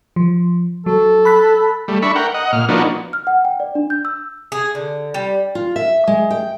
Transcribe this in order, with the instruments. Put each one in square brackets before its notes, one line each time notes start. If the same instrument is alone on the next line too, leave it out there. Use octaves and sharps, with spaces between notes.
[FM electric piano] F3
[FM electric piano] F#3 [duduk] A4
[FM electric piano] B5 F#6 B6
[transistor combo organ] G3 A3
D4 E5 B5 C#6
A#4 F#5 G5
D#5 F#5
A#2 F6
F3 A#3 B3 D4 D#4 F#4
[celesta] F6
F#5
G5
D5
D4
G6
E6
[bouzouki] G#4
D3
G3
[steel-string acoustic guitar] F4
E5
G#3
G5